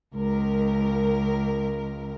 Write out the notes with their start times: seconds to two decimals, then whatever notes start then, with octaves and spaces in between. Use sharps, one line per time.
0.15 C#2 A#4